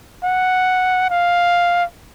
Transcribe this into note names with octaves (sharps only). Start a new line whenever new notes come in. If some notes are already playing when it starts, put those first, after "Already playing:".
F#5
F5